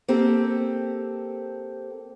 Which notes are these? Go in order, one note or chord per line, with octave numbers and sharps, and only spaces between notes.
A#3 C4 G4 A4